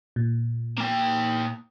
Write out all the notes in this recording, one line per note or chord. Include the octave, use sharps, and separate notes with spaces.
A#2
A#3 G5